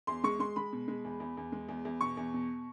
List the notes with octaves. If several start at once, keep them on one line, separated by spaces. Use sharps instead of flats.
E2 C6
G#3 C#6
G#3 C6
G#3 B5
B2
G#3
E2
E2
E2
G#3
E2
E2
B2 C#6
E2
B2